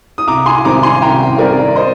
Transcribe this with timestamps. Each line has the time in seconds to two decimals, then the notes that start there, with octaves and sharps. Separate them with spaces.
0.18 D#6
0.27 C2 A#5 D6
0.46 G#5 C6
0.65 C3 D#3 G3 C4 A#5 D6
0.83 G#5 C6
1.02 C2 G5 A#5
1.38 C3 D#3 G3 C4 A#4 D5
1.76 C5 D#5